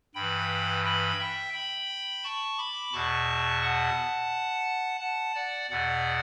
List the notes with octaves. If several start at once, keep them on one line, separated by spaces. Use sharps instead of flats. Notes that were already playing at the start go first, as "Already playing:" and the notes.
G2 G5 B5
E3
G5 B5
E5 G5
G5 B5
A5 C#6
B5 D6
E2 B2 A5 C#6
F#5 A5
F#5 A5
D5 F#5
E2 B2 D5 F#5